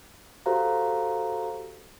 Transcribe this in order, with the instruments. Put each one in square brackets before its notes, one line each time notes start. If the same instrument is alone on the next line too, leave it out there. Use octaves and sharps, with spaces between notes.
[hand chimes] F#4 G4 A4 C5 F5 A#5